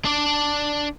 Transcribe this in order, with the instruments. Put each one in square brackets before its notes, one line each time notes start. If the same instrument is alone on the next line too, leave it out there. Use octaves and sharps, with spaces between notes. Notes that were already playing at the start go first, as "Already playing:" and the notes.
[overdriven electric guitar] D4 D5